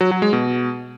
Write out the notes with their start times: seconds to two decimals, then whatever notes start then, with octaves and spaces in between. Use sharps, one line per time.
0.01 F#3
0.11 F#3
0.22 G#3
0.33 B2